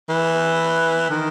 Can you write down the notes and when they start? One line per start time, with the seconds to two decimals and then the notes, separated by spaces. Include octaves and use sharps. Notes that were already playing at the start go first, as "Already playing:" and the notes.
0.09 E3
1.10 D#3